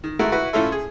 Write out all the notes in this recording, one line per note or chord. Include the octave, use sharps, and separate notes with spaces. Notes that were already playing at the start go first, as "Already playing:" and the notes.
D#3
G#3 A3 E4 F#4 A#4
E4 F#4 B4
A2 C#4 F4 A4 E5
G#4